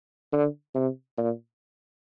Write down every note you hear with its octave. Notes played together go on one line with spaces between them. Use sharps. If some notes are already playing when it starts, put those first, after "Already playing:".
D3
C3
A#2